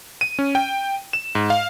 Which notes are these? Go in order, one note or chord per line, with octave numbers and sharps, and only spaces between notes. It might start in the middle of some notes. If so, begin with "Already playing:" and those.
D#7
C#4
G5
E7
G#2
F5